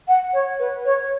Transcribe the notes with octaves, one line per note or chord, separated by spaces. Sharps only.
F#5
C#5
B4
C#5